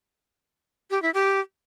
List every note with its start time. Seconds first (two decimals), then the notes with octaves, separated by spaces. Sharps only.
0.91 G4
1.02 E4
1.14 G4